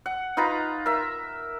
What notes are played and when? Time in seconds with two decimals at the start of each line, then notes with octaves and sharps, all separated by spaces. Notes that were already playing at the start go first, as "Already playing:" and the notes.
0.06 F#5
0.37 D#4 F4 B4 A#5
0.86 A#4 E5